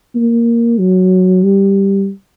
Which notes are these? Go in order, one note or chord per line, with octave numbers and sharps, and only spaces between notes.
A#3
F#3
G3